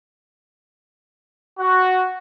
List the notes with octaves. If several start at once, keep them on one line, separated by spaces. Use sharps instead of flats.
F#4